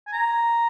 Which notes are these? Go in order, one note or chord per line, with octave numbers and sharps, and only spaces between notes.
G#5
A#5